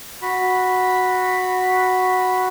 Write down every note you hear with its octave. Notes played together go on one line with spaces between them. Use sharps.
F#4 B5